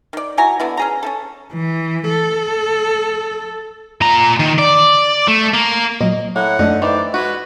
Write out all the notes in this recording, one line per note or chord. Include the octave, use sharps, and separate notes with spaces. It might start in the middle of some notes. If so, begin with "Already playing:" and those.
D#3 D5
E4 F#4 G#5 A#5
D3 B3 E4
C#4 G#4 A#5
C#4 E4 A4
E3
A4
A#2 A#5
D#3
D5
A3
A#3
A#2 F#3 D#5
A2 A#3 F#5
F#2 D3 A3 D4 D#4
D#3 E3 C5 D5
G#3 F#4 B4